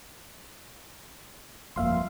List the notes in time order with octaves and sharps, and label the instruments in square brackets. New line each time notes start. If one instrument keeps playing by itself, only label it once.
[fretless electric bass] G1 F2 A#3 [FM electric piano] E5 F5 C6